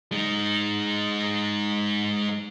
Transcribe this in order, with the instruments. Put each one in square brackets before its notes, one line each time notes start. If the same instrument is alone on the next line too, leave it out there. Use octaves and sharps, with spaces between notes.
[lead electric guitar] G#3 D#4